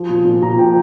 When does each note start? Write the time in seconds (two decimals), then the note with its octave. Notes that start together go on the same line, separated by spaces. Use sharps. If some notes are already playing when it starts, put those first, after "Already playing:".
Already playing: F3
0.09 A#2
0.25 A#2
0.42 A#2 A#5
0.58 F3 G5